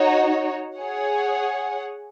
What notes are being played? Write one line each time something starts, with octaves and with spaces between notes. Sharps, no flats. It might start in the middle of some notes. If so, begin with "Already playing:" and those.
Already playing: D#4 F#4 C#5
G#4 C#5 F#5